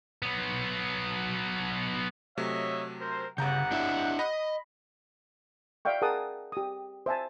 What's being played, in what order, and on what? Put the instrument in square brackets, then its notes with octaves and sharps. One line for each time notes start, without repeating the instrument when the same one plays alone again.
[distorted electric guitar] F#3 B3
[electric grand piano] C3 F#3 A3 [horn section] C#5 D#5 E5
[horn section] A#4 C5
[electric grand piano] G1 A#5 G6 [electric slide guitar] C#3 [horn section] G4 F#5
[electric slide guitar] D4 E4 E5
[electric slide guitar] D#5 [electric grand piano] B5 A#6
[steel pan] D5 E5 F5 G5 C#6
G#4 A#4 F#5 A5 D#6
G4 D#6
C5 E5 G#5 A5